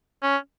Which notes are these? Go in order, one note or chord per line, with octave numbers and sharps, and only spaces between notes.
C#4